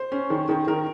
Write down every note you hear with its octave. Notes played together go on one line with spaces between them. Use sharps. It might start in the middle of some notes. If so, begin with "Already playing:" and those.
Already playing: C5
C#4
D#3
D#3
D#3 A#4